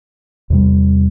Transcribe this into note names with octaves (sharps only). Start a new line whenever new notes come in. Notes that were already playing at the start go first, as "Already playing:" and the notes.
E2 C3 G3